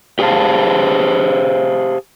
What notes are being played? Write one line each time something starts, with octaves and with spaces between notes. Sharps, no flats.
G4 G#4 C5 D5 F5 A5